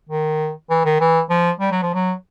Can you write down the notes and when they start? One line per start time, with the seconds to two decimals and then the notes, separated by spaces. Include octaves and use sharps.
0.09 D#3
0.70 E3
0.85 D#3
1.00 E3
1.30 F3
1.60 G3
1.72 F#3
1.83 F3
1.94 F#3